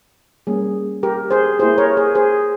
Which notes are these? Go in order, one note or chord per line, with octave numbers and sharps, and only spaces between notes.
G3 A#3 C#4 G#4
G4 A#4
G#4 C5
A#3 E4 G4 G#4 C5
A#4 C#5
G#4
G#4 C5